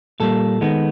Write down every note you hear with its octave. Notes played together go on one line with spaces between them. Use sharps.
A#2 G3 A#3 A4
D#3 G#3 B3